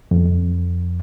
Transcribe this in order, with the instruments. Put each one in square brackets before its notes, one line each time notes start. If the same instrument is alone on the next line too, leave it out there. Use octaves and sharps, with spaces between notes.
[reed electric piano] F2